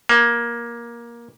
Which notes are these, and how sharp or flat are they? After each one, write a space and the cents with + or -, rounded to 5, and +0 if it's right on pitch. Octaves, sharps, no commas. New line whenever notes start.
A#3 +15